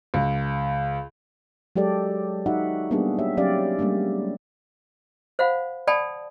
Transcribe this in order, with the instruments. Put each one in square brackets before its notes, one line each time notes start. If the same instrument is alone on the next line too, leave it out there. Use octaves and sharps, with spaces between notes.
[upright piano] C#2
[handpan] F#3 G#3 G4 A4 D5
D#4 F#4 E5 F#5
G3 A#3 B3 D4 G4 G#4
G4 C#5 E5
F#3 C#4 G4 D5 F5
G3 G#3 A#3 D4
[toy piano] C5 F5 F#5 B5
D5 F#5 G5 A5 B5 D#6